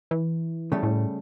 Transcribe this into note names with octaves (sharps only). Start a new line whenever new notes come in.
E3
C#3 G3 A3
A2